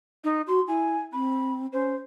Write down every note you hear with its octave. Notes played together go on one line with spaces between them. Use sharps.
D#4
F#4 C6
E4 G#5
C4 B5
C#4 C5